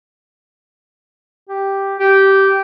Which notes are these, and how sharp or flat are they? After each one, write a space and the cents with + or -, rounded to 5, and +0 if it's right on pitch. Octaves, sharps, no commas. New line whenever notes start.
G4 +0
G4 -15